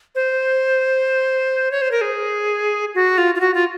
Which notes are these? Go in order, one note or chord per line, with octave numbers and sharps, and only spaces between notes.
C5
C#5
C5
A#4
G#4
F#4
F4
F4
F#4
F4